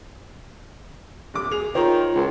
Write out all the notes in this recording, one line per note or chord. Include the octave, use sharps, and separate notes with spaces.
D#1 D6
G#4 F7
D#3 F4 C5 C#5 A#5
C#2